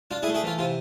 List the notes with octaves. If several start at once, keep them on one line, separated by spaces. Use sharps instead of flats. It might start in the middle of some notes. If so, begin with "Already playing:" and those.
D4 F4
E4 G#4
A3
E4 G#4
E3 F4
C3 F4